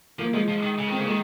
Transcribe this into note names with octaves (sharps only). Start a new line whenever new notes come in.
F3 A#3
F3 G#3
F3
D#3
C#3
D#3 C4
C#3 A#3
D#3 G#3